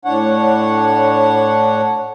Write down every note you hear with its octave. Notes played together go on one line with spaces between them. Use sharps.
A2 D4 C#5 F#5